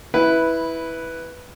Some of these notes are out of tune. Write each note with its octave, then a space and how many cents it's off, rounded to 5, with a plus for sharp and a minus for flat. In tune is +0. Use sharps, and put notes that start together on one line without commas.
E4 -10 B4 +0